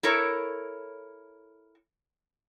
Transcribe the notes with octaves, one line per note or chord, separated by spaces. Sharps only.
E4 A4 A#4 C#5